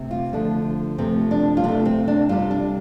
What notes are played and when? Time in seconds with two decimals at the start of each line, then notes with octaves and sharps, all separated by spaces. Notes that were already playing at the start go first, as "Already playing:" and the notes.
Already playing: C3 A3
0.11 F4
0.33 D3 F3 A3 D4
0.98 C3 F3 A3 C4
1.31 D4
1.57 F4
1.64 C3 A3 D4
1.85 C4
2.08 D4
2.29 C3 G3 F4
2.51 D4